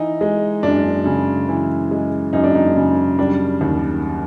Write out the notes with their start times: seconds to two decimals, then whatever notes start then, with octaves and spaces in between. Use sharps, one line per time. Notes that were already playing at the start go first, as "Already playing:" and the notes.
Already playing: E3 D#4
0.21 G#3
0.63 F#2 D4
1.06 C#3
1.49 E3
1.91 G#3
2.33 F#2 D#4
2.44 D4
2.55 D#4
2.76 C#3
3.19 G3 D4
3.61 D#2